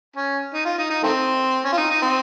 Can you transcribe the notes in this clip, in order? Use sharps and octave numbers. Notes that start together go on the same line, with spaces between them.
C#4
D#4
F4
D#4
D#4
D#3 A3 C4
C#4
F4
D#4
D#4
C4